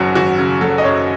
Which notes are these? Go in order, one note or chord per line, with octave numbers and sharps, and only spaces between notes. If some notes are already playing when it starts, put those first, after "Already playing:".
Already playing: G#1 F#2 C#3 F#3 C#4 F#4
G#1 F#4
C#3
F#3 A4
D#5
F#2 C#5